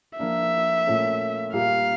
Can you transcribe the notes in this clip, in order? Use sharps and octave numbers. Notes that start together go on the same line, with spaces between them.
F3 A#3 D4 E5
A#2 A3 C#4
A#2 G3 A#3 F5